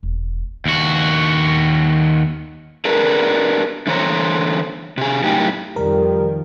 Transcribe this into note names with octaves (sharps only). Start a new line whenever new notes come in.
E1
D#2 F#4
D4 G#4 A#4 B4
D3 E3 C5 C#5 A#5
C3 G#4
F#2 A2 D#4 G4
F2 D#3 F3 G3 A#4